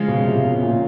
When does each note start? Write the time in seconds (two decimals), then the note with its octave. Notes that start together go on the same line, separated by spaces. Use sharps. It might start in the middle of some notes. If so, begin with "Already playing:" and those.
Already playing: C#3 F3 G#3 C#4 F4
0.08 B2
0.26 C3
0.44 B2
0.63 A#2